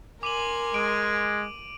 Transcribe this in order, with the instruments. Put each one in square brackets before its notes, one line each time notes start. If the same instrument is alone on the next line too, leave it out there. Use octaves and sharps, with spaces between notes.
[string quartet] A#4 G#5 C6 [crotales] D6 D#7 F#7
[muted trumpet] G#3 [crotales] D7